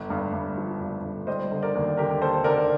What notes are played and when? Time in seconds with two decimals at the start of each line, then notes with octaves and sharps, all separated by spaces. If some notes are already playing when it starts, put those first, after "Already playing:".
Already playing: G1
0.10 G2
0.33 G2
0.58 F3
0.81 G2
1.05 G1
1.27 G3 C5 D#5
1.52 D3
1.63 A#4 D5
1.75 D#2
1.97 D3 G4 A#4
2.21 A#3 A4 C5
2.44 D3 A#4 D5